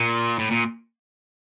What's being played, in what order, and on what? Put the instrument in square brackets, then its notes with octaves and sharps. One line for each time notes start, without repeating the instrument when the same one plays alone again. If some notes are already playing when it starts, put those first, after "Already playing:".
Already playing: [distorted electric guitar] A#2
A2
A#2